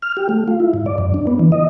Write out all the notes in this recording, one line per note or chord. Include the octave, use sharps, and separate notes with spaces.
F6
G4
A3
F4
E4
G#2
D5
F#2
D4
B3
E3
D#5